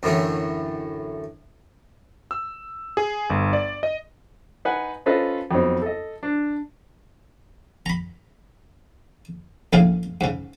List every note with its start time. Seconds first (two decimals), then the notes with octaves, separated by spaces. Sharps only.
0.03 F#2 A2 D3 E3
2.31 E6
2.97 G#4
3.30 G1
3.53 D5
3.83 D#5
4.65 D#4 B4 F#5 G#5
5.06 C#4 F4 A4 B4 C5 D#5
5.51 F2 F#3 B3 C4 D#4
5.82 A4 D#5
6.23 D4
7.86 A#5 B5
9.73 A#1 A2 C#3 D#4 G#4 F5
10.21 G#2 C#3